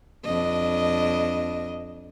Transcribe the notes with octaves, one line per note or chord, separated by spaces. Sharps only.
F2 D4 D#5